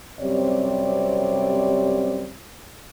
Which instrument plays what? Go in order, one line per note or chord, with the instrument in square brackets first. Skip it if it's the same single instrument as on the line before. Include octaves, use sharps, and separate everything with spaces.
[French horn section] F#2 C3 G3 C4 C#5 D5